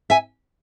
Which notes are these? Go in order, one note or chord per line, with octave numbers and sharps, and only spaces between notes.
E5 G#5